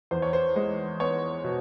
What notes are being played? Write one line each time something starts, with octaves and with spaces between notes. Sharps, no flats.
E2 C5
C#5
C5
G#3
B3 C#5
B2